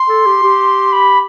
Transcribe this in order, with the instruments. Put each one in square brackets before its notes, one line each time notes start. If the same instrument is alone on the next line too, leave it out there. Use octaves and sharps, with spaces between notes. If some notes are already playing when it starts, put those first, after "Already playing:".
Already playing: [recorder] C6
[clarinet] A4
G4
G4
[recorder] B5